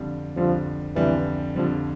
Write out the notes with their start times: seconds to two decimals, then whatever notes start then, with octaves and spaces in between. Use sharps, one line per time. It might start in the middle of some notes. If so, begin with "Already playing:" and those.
Already playing: F2 D3 G3
0.36 F2 D3 F3 G3
0.96 F2 D3 E3 G3
1.56 F2 D3 F3 G3